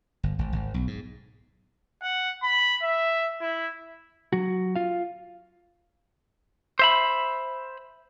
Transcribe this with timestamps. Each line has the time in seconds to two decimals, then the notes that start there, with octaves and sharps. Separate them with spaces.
0.23 G1
0.39 G#1
0.53 G#1
0.74 B1
0.87 G#2
2.02 F#5
2.43 B5
2.82 E5
3.41 E4
4.33 F#3 F#4
4.76 F4 F5
6.79 C5 E5 B5